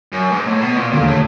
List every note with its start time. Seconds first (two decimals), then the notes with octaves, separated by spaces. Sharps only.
0.12 F#2
0.32 G#2
0.47 A2
0.61 B2
0.76 A#2
0.91 E1 D#2 A#2 D3 F3 A3
1.06 A2